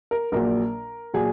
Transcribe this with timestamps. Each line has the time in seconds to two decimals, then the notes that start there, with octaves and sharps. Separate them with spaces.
0.11 A#4
0.32 A#1 A#2 F#3 A#4
1.14 A#2 F#3 G#4